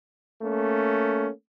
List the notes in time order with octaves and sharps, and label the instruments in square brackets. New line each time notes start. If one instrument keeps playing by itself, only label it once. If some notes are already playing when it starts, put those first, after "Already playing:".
[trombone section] A3 A#3 C#4